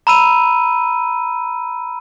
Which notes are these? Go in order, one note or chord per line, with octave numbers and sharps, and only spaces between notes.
A#5 B5 E6 D#7